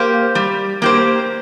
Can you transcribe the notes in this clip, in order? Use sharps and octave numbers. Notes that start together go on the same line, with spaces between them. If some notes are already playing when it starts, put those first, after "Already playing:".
Already playing: A#3 G4 C5
G3
A#3 G4 C5